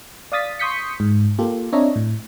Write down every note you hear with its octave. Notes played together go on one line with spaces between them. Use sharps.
D5 F5 D#6 A6 B6
C6 C#6 D#6 G6 B6 C#7
G#2
A#3 F4 G4 A4
C4 D4 C#5 D#5 E5 A#5
A2